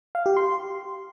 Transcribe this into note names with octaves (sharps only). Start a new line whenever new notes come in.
F5
G4
C6